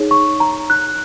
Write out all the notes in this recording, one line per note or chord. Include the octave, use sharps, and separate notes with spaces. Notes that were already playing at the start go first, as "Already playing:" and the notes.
Already playing: D#4 G#4 C#5
C#6
A#5
F#6